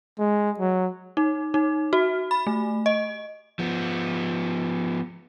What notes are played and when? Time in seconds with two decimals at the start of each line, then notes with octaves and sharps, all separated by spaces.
0.19 G#3
0.59 F#3
1.17 D#4
1.54 D#4
1.93 F#4
2.31 B5
2.47 A3
2.86 D#5
3.59 F3 B3